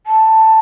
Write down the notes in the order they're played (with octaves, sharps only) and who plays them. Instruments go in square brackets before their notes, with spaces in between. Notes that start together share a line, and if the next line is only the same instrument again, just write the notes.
[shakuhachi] A5